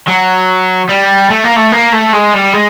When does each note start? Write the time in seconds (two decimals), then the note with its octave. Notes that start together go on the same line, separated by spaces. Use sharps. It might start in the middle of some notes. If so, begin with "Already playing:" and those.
0.07 F#3
0.89 G3
1.30 A3
1.44 A#3
1.56 A3
1.72 A#3
1.92 A3
2.13 G#3
2.34 G3
2.54 G#3